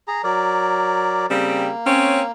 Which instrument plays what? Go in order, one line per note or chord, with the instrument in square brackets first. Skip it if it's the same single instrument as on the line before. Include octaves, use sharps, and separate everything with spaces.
[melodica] G#4 A#5
F#3 A#4 D5
[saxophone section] C#3 G3 C4 [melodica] A#3
[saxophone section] C4 C#4